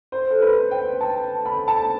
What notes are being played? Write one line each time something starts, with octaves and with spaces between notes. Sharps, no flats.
C5
A4
B4
G5
A5
B5
A5